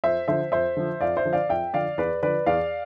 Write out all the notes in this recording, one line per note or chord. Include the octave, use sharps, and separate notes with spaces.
F2 C5 E5
D3 F3 C5 E5
F2 C5 E5
D3 F3
F2 D5 F5
C5 E5
D3 F3
D5 F5
F2 E5 G5
D3 F3 D5 F5
E2 B4 D5
D3 F3 B4 D5
E2 D5 F5